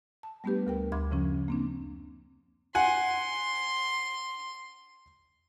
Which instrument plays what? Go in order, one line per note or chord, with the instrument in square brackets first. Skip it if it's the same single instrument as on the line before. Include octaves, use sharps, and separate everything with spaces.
[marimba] A5
G3 A3 B3 D4 G4 B4
D2 A#4 G5
D2 E5 B5 C6 D6 G#6
F#2 C#3 F3 C#4
A#3 C4 D4
[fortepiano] F#5 G#5 [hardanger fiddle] C6